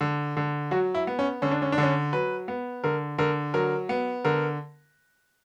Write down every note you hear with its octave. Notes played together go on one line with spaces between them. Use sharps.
D3
D3
F#3 F#4
E4
B3
C#4
D3 C#4
D4
C#4
D4
D3 C#4
F#3 B4
B3
D3 A#4
D3 A#4
F#3 A#4
B3
D3 A#4